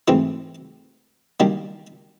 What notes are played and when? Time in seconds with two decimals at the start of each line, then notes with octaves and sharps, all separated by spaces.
0.08 G#2 E3 A3 C4 E4
1.40 D#3 G3 A#3 D4